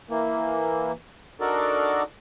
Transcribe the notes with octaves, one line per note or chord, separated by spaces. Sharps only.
E3 A#3
D4 D#4 F#4 A4 A#4 D5